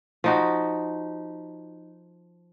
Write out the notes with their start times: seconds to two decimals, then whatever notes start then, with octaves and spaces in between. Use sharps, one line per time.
0.24 F3 D#4 F#4